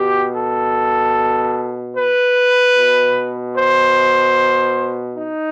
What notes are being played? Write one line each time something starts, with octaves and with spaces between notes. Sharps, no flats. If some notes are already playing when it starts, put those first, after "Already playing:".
Already playing: B2 G4
A4
B4
B2
C5
D#4